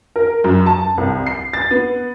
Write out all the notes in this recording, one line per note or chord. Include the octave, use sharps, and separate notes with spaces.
A#4
F#2
A5
C2
C7
A6
B3